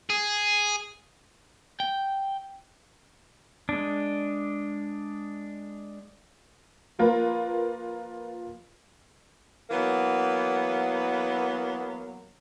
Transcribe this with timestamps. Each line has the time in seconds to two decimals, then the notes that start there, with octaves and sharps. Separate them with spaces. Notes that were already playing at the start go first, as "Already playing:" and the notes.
0.10 G#4
1.80 G5
3.69 G#3 D4
6.99 F3 A#3 F4 A#4 B4
9.70 E3 F#3 A#3 B3